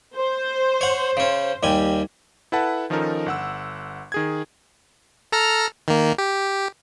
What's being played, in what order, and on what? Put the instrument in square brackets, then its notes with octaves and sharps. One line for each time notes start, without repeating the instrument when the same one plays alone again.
[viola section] C5
[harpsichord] C#5 F#5
C#3 C#4
D#2 G3 G#5
[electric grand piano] E4 A4 B4 F#5 A5
D#3 F3 C#4 D#4 A4 A#4
G1 F#5 E6
D#3 G#4 G#6
[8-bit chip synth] A4 A#5 F6
D#3 A#3
G4